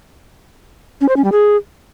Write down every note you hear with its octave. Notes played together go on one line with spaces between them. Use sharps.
C#4
C5
C#4
G3
G#4